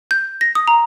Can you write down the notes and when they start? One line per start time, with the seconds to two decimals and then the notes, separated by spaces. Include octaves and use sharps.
0.11 G6
0.41 A#6
0.55 D#6
0.68 A#5